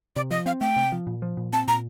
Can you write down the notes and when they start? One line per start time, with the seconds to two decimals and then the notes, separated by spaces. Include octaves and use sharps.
0.16 C3 D5
0.31 F3 D#5
0.46 C4 F5
0.61 A3 G5
0.76 C3
0.92 F3
1.07 A#2
1.22 F3
1.37 A#2
1.53 C4 A5
1.68 A#2 A#5